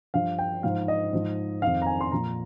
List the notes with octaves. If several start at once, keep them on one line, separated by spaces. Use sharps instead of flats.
G2 F3 F5
G5
G#2 F3 F5
D#5
G#2 F3
F2 D#3 F5
A#5
G#5
C6
A#2 F3 A#5